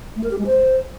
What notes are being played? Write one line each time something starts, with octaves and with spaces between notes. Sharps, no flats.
A3
A#4
G4
G#3
C5